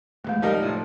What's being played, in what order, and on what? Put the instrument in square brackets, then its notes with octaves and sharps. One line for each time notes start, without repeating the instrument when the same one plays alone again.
[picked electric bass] D#1 E2 [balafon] G#3 A3
[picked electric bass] C2 F3 [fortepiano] G3 D#4 A#4
[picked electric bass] A2 F3